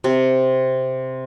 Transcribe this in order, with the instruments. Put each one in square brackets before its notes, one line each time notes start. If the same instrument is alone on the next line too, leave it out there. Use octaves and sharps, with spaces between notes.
[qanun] C3